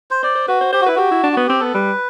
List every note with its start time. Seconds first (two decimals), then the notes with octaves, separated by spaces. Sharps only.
0.11 C5
0.23 C5 D5
0.35 C5
0.48 F#4 B4
0.61 C5
0.73 G4 C5
0.81 F#4
0.86 E4 B4
0.95 F#4 G4
1.11 E4
1.24 D4
1.32 B3 F#4
1.47 C4 G4
1.60 B3 A4
1.74 G3 B4